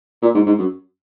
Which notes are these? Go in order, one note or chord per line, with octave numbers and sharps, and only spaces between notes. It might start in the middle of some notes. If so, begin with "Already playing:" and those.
A#2
G#2
G#2
F#2